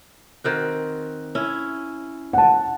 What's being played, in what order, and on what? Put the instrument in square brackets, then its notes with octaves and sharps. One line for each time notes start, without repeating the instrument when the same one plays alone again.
[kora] D#3 C4 F#4
C#4 E4
[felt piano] F#5 A5